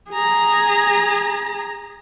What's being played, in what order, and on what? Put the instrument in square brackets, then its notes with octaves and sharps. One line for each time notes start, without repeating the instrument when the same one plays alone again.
[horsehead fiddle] G#4 A#5